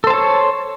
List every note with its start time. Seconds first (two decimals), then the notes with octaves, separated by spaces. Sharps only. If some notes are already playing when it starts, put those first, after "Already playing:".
0.04 A4
0.07 C5
0.10 A5
0.14 C#5